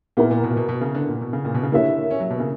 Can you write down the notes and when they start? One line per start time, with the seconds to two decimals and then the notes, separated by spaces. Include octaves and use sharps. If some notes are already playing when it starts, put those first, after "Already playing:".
0.17 A#2 B3 E4 A#4
0.31 A#2
0.43 B2
0.51 A#2
0.57 B2
0.69 B2
0.81 C#3
0.95 D3
1.08 A#2
1.21 B2
1.33 C#3
1.45 A#2
1.54 B2
1.63 C#3
1.72 D3 A#3 E4 G4 C#5 E5
2.11 C#4
2.20 F#3
2.30 B2
2.40 C#3